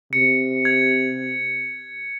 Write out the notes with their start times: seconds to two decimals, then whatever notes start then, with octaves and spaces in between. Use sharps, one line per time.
0.13 C3 C#7
0.65 G#6